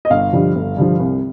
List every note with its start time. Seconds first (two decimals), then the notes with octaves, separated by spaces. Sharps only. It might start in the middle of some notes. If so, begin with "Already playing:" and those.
0.05 D#5
0.10 G1 F5
0.33 G2 D3 F3
0.56 G1
0.77 G2 D3 F3
1.00 C2